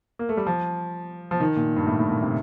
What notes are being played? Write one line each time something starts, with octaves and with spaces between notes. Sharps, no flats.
A#3
A3
G3
F3
F3
D#3
A#2
G2
A2
A2
A#2
C3